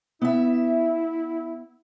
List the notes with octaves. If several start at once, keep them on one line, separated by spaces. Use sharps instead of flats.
B3 E4 E5